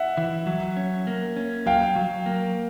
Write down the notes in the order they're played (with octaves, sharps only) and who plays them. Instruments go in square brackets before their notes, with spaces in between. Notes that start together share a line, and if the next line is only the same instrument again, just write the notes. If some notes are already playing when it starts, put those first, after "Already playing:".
Already playing: [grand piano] E5 F#5
[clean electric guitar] E3
F#3
C#4
A#3
C#4
[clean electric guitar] F#3 [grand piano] F5 G5
[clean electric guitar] F#3
A#3